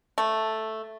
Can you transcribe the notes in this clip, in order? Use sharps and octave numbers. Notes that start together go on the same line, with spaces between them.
A3